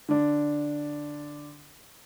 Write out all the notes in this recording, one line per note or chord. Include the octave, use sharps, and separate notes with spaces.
D3 D4